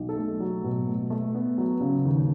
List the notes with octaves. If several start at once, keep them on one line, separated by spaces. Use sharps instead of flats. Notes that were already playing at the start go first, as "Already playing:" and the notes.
Already playing: B1
A4
A3
F#3
B2
A3
A3
B3
F#3
C#3
D#2